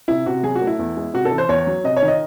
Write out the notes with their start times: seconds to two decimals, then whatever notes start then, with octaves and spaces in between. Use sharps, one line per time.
0.08 C3 E4
0.26 C3 F#4
0.43 F#3 G#4
0.56 F#4
0.61 A3
0.67 E4
0.79 E2
0.97 G#3
1.14 C3 F#4
1.25 A4
1.32 E3
1.38 C5
1.49 E2 C#5
1.67 F#3
1.84 C3 D#5
1.96 C#5
2.02 D#3
2.08 D#5